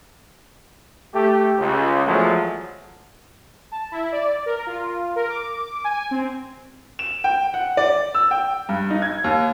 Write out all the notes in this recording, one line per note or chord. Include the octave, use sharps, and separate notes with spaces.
A3 G4
C#2
E2 F3 F#3 G#3 A3
A5
E4
D5
A#4
F4
A#4
D6
G#5
C4
E7
G5
F#5
D5
E6
G5
G2
D#4
G#6
D#2